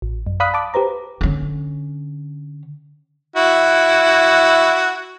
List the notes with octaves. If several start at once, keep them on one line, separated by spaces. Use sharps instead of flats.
A1
F#2
D5 F5 B5 D#6 F#6 B6
A5 D6
G4 B4 C5 A#5
D3 C#4
E4 F#4